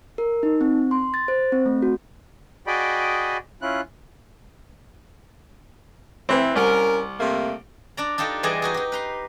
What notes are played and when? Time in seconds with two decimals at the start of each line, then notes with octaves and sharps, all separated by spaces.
0.18 A#4
0.43 D#4
0.61 C4
0.91 C6
1.14 A6
1.28 C5
1.52 C4
1.66 A3
1.82 F#4
2.67 F#4 G#4 D5 D#5 G5 B5
3.62 C#4 E4 F4 F#6
6.29 E3 C4
6.55 C2 C#4 A#4
7.20 C3 A3 A#3
7.97 D4 D5 A#5
8.18 D4 D#4 F4 G4 A4
8.43 E3 G3 G#3 G#4 D5 D#5
8.62 D#4 F#4 G#4
8.74 D#4 G4
8.92 B4 A#5 C6